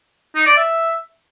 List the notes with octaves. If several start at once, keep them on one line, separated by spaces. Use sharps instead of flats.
D#4
D5
E5